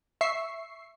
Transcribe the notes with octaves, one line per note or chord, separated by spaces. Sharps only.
E5 C#6 C7